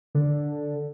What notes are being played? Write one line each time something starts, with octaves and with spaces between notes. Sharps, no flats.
D3